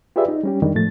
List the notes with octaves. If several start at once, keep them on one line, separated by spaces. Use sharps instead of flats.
F4 G4 G#4 B4 D5 E5
D#4
G3 C#4 G4
F2 D#3 G3 G#3 D4
A2 F3 A3 A6